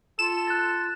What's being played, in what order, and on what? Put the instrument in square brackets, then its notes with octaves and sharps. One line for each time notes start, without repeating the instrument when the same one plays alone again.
[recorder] F4 [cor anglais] A4 [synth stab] E7
[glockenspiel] F#6 A6